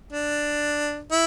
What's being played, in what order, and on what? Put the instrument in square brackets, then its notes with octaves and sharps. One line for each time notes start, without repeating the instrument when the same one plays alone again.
[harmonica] D4
E4